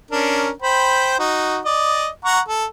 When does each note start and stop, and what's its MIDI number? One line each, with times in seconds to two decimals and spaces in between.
0.11 0.50 61
0.11 0.50 62
0.11 0.50 70
0.62 1.19 72
0.62 1.19 79
0.62 1.19 83
1.19 1.59 63
1.19 1.59 66
1.65 2.08 74
1.65 2.08 75
2.25 2.40 78
2.25 2.40 82
2.25 2.40 85
2.48 2.65 69